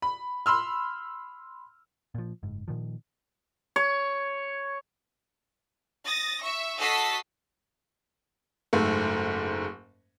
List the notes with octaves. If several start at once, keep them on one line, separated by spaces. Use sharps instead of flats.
B5
B5 C6 E6 F6
A#2 F3
F#1 G#2
A#2 D#3 F3
C#5
D#6 A6 A#6
E5 C#6
F#4 A4 D#5 A5 B6 C7
F#1 G#2 A3